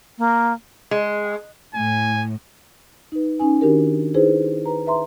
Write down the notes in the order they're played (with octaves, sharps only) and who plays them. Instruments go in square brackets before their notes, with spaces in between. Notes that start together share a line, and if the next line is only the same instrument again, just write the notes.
[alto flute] A#3
[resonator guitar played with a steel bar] G#3
[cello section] A2 [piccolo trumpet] G#5
[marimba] D#4 B4
C#4 D#4 G#5
D#3 D4 F#4 G4 A#4
D#4 E4 G#4 B4 C5
B4 A#5
B4 E5 A#5 C6